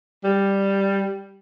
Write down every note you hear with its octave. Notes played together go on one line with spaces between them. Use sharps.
G3